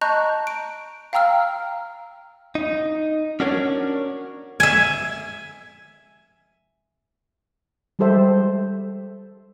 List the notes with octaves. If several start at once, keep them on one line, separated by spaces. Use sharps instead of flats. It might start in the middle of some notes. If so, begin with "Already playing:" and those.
D#5 A5 A#5 C#6 F#6 G6
D7
F5 G5 A#5 E6 F6
D#4
C#4 D4 F#4 A#4 C#5
E5 G#5
G3 G#3 G4 A4 C5 E5